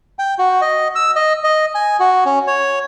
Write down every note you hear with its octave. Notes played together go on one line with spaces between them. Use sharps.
G5
F#4
D#5
E6
D#5
D#5
G#5
F#4
C#4
C#5